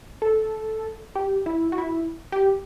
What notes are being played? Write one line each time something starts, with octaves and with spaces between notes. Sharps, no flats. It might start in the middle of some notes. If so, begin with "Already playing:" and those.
A4
G4
E4
F#4
E4
G4